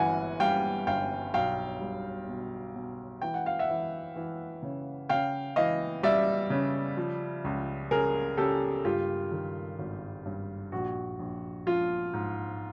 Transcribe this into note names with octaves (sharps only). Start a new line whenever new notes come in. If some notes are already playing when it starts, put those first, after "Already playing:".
Already playing: G1 E3 F#5 G#5
G3 F5 G5
G1 F5 G5
B1 F5 G5
G3
B2
B2
E3 G5
F#5
F5
E5 F#5
E3
E3
C#3
C#3 F5 G5
E3 D#5 F5
G3 D5 E5
C#3
F3
C#2
C#3 G#4 A#4
C#3 G4 A4
G2 F4 G4
D#3
G#1
G2
A#1 F#4
A#1
F3 F4
G#2